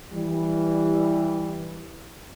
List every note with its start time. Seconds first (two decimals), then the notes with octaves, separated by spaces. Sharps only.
0.12 E3 G3